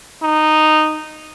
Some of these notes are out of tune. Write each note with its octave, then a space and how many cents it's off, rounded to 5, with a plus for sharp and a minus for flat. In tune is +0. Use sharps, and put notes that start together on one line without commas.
D#4 -10